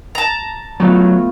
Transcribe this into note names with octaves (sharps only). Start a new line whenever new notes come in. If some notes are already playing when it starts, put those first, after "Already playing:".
A5 A#5
F#3 A3 B3 F4